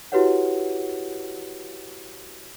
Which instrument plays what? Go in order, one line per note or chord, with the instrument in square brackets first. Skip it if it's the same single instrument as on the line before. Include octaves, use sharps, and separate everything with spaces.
[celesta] E4 F#4 G4 B4 C#5 F#5